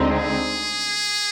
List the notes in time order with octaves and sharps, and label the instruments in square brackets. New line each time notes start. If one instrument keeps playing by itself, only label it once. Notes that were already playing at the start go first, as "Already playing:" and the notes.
Already playing: [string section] D2 D3 G#3 C4 D#4
[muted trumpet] G#4